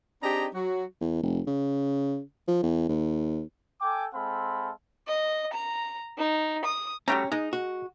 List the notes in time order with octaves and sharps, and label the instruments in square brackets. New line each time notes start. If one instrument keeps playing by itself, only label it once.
[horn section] C4 D4 D#4 G4 G#4 A#5
F#3 F#4
[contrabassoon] E2
F1
C#3
F3
E2
D#2
[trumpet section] A4 G5 G#5 D6
G#3 C4 A4 F5 B5
[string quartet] D#5
A#5
D#4
D#6
[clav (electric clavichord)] G3 A3 F#4 [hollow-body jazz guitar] C#4 [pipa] G4 G5 A#5
[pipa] G#3 [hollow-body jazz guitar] D#4 [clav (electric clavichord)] A#5
[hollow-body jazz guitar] F#4